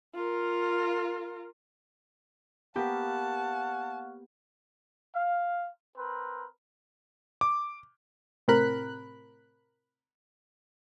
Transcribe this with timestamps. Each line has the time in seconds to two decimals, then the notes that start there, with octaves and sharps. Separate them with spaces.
0.15 F4 A#4
2.76 A#3 B3 G4 C#5 F5 F#5 A5
5.16 F5
5.98 C4 A#4 B4
7.41 D6
8.48 A2 C3 C4 A#4 B5 F#6